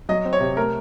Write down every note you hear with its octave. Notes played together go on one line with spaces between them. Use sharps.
F#3 D#5
C4
C#5
C3
A3 A#4